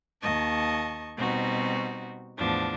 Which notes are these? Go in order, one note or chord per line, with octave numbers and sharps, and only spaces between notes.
D#2 D#5 A5 C#6
B2 G3 C4 D#4 F#4
E2 A2 F3 D4